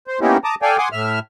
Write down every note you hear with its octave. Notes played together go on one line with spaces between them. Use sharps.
C5
A#3 B3 C#4 D#4 E4 G4
A5 A#5 D6 D#6
A4 D5 F5 G5 G#5
F#5 G#5 C6 D6 D#6
A2 E5 F6